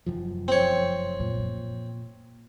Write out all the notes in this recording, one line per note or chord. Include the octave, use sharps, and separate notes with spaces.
F1 F#2 F3
C4 C#5
A#2